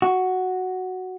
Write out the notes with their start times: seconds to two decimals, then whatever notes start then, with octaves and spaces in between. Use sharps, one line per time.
0.02 F#4